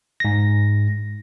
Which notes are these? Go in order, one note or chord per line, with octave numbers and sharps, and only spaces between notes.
G#2 A#6